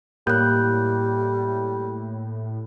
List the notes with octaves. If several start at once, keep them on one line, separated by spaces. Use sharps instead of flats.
A2 G3 A#3 F#6 G6